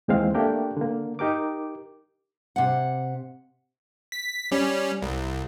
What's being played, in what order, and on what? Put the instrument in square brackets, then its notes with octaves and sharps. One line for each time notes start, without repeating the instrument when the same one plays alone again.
[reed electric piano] D#2 E3 G#3 C4 F5
A3 A#3 D4 G4 A#4 G5
D3 A#3
D#4 G4 A#4 D6
[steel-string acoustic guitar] C3 F#5
[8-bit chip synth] B6
G3 C#4
C2